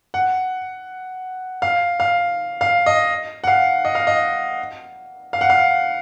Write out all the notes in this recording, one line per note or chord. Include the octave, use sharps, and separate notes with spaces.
F#5
F5
F5
F5
D#5
F#5
F5
D#5
F5
D#5
F5
F#5
F5